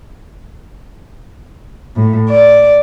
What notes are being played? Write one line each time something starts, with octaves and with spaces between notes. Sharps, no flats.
A2
D5